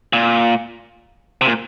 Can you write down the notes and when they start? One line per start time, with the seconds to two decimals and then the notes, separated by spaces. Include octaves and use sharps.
0.13 A#2
1.41 C3
1.46 A#2